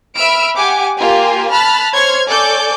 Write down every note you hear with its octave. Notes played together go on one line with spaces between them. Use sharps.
E5 B5 E6 F6 D7
G4 F#5 G#5 D6
A#3 F4 G4 G#5
A5 B5 F6 F#6 B6
C5 C#5 C6 F6 G#6
A4 C#5 D5 G#5 D6 G6